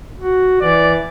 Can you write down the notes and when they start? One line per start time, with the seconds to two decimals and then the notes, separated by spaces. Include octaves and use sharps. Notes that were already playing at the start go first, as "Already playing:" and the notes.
0.19 F#4
0.61 E3 D5